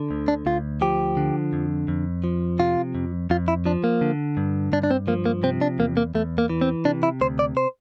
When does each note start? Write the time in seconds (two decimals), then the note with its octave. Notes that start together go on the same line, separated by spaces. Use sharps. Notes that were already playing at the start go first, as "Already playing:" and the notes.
Already playing: D3
0.11 D2
0.28 D4
0.46 D2 F4
0.81 F3 G4
1.17 D3
1.53 F2
1.88 F2
2.24 F3
2.59 C3 F4
2.95 F2
3.30 F2 F4
3.48 E4
3.66 F3 D4
3.84 A#3
4.01 D3
4.37 G2
4.72 G2 D4
4.83 D4
4.91 C4
5.07 F3 A#3
5.26 A#3
5.43 C3 C4
5.61 D4
5.79 E2 A#3
5.97 A#3
6.15 E2 A3
6.38 A#3
6.50 E3
6.61 C4
6.85 C3 D4
7.03 E4
7.21 D2 C5
7.39 D5
7.57 C5